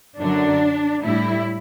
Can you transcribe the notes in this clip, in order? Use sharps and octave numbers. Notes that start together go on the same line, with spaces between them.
F#2 D3 F#3 D4
A2 G3 E4